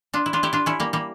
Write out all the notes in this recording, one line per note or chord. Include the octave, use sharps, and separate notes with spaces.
D4 F4
E4
D4 F4
E4 G4
D4 F4
C#4 E4
G3 A#3
G3 A#3